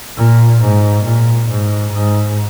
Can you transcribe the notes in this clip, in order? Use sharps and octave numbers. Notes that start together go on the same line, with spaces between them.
A#2
G#2
A#2
G#2
G#2